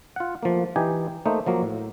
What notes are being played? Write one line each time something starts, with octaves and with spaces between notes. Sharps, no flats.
F4 F#5
F3 A3 A#3
E3 D#4 G4 G#5
A3 A#3 D#4 C5
F3 F#3 A#3
A2